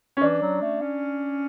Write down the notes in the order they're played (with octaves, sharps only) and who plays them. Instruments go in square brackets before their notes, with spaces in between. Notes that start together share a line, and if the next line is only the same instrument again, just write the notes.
[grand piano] C#4
[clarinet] E3 [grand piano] D4
[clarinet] F#3
A3
C#4